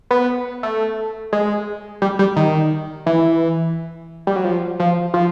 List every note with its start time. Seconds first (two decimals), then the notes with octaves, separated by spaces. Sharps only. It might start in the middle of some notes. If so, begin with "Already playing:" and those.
0.11 B3
0.63 A3
1.33 G#3
2.02 G3
2.19 G3
2.36 D#3
3.06 E3
4.27 G3
4.36 F#3
4.45 F3
4.80 F3
5.14 F3